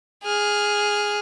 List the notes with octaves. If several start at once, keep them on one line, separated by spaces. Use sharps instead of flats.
G#4 F6